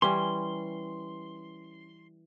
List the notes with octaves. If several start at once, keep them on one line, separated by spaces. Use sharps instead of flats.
E3 G3 C#4 C6